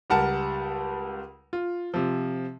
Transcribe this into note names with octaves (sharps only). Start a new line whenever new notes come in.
C#2 G3 A#4 F#5 A5
F4
C3 F3